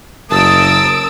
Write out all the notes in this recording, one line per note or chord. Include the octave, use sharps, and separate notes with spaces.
F#1 A#4 A5 D#6 E6 D7